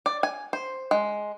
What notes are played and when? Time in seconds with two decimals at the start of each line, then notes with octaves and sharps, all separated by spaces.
0.06 D5
0.23 G#5
0.53 C5
0.91 G#3